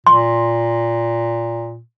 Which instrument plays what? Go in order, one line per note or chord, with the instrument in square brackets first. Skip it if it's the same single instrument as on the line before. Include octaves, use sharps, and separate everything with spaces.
[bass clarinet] A#2 [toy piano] C6